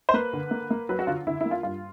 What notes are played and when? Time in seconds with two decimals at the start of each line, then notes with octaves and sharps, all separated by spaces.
0.09 C5
0.14 A#3 B4
0.33 D3
0.51 A#3
0.70 A#3
0.89 F#3 B4
0.99 F#4
1.07 D3 F4
1.27 D3 E4
1.41 A#3 E4
1.51 F4
1.63 G2 F4